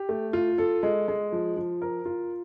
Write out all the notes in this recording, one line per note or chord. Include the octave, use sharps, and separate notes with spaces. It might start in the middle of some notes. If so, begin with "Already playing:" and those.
Already playing: G4
A3
F4
A4
G#3
G#3
F3
F3
A#4
F4